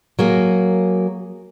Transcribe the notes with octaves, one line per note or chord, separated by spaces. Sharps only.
F#3 A#3 G#4